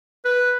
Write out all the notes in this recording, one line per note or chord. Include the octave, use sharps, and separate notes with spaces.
B4